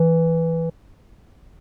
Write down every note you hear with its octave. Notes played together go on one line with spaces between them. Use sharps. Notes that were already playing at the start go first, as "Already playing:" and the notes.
Already playing: E3